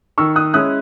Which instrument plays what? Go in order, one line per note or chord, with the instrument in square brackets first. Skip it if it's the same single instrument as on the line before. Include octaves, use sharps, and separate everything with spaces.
[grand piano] D#3 [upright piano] C#6 E6
[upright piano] D#6 F#6
[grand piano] G#3 C#4 E4 [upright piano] D#6 F#6